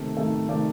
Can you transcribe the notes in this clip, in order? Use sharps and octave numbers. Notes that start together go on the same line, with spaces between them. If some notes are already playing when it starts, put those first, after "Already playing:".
Already playing: C3 D#3 A3
C3 D#3 A3
C3 D#3 A3 D5